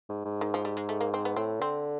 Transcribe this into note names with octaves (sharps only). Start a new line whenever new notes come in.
G#2
G#2
D#3
F3
G3
G#3
A3
A#3
C4
B3
A2 C4
D3 C4